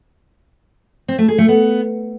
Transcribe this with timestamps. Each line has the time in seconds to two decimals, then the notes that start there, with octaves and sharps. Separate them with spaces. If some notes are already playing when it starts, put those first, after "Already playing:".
1.08 C4
1.18 A3
1.28 G#4
1.38 A3
1.48 B3